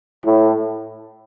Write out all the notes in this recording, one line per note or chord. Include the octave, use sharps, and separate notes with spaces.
A2